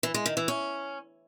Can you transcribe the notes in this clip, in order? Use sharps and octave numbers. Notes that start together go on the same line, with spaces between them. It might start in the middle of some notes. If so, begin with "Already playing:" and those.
E3
G#3
D#3
E3
C#4